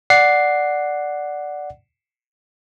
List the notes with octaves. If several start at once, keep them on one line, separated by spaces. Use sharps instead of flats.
D5 F#5 C7